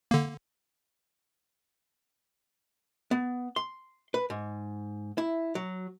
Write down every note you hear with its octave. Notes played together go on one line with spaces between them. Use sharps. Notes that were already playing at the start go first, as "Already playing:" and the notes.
D3 A#3
B3
C6
B4
G#2
E4
F#3